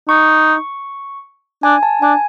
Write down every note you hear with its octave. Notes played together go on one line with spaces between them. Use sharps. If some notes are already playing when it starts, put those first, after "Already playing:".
D#4 C#6
D4 G#5
A5
D4 G#5